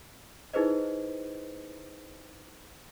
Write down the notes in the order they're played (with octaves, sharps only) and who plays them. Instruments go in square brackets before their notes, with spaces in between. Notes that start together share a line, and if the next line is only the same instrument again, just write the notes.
[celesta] D#4 E4 G#4 B4 C5 D#5